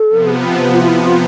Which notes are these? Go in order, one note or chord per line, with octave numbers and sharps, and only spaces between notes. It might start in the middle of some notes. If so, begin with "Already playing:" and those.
Already playing: A4
C3 F3 B3
F4
F4
E4
F4